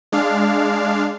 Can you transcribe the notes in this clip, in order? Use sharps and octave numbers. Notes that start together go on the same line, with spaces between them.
G#3 D4 F5